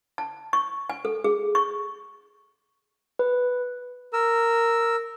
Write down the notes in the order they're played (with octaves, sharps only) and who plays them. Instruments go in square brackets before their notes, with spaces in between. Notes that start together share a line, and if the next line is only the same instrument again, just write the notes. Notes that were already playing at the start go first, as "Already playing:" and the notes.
[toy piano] A5
C#6
G#5
A4
G#4
C#6
[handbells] B4
[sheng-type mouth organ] A#4 E6